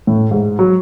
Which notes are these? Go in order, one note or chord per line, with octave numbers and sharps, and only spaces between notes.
A2
G#2
F#3